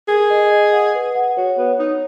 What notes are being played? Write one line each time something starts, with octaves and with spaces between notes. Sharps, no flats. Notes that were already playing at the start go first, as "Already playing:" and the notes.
G#4 A#4
D#5
D#5
F#5
B4
F#5
F#4 C#5
B3 C#5
D#4 C#5